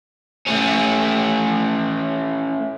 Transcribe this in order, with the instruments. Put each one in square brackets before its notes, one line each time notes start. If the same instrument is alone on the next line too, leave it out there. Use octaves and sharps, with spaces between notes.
[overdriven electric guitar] A3 C#4